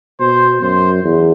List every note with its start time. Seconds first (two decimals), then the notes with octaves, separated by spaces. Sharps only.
0.20 B2 C5
0.62 F#2 C5
1.04 E2